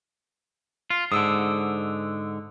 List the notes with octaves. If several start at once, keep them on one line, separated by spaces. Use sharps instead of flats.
F4
G#2 D3 D#6 E6 D7